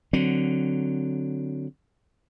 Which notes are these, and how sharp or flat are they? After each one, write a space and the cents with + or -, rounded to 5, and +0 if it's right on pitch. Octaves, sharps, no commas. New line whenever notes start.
D3 +0 F#3 +0 C4 +0